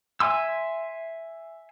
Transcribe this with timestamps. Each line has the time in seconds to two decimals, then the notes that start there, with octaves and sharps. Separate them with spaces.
0.20 E5 G#5 C6 E6